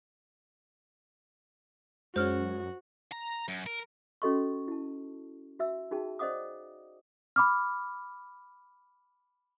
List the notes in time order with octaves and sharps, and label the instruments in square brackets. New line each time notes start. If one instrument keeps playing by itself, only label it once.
[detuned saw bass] F#2 [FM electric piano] G#3 C#4 [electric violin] F#4 [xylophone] C5 F6
[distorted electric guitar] A#5
F#2
A#4
[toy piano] C#4 F#4 A4 D#5 C6 C#6
E4 A5
F#4 E5 E6
D#4 F#4 G#4 G5 A5
C5 D5 D#5 F#5 D6 D#6
[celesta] B5 D6 F6